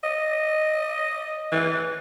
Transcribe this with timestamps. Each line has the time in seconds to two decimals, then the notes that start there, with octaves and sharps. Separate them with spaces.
0.04 D#5
1.52 E3